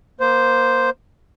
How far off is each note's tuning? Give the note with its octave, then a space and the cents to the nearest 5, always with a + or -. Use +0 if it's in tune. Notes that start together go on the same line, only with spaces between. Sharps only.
A#3 +20 C5 -5